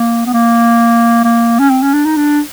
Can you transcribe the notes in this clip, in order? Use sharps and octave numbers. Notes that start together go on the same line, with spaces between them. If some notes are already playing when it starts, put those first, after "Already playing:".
Already playing: A#3
B3
A#3
A#3
C#4
C4
C#4
D4
D#4
D4